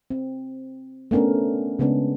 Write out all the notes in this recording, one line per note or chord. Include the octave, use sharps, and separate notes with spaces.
C4
A3 B3 C#4 D4 A#4
C#3 G#3 B3 C#4 D4